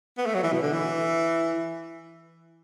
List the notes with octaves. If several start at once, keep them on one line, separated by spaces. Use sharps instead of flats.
B3
A3
F#3
E3
B2
D3
E3